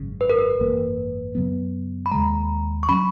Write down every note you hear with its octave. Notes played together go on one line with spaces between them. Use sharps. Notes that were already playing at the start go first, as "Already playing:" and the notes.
Already playing: G#1 F#2 C#3
B4
A#4
B4
G#1 F#2 E3 A#3
F#2 C#3 F#3 B3
B5
D#2 C#3 G#3 A#5
C#6
F#3 C#4 B5